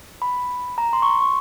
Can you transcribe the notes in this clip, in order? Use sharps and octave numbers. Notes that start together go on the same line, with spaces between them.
B5
A#5
C6
C#6
C6
C#6